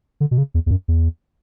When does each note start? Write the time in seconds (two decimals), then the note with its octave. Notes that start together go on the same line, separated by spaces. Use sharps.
0.20 D3
0.31 B2
0.38 C#3
0.54 E2
0.66 E2
0.71 F#2
0.88 E2